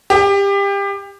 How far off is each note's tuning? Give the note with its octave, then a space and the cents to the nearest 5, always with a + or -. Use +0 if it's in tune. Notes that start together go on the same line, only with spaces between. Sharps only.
G4 +25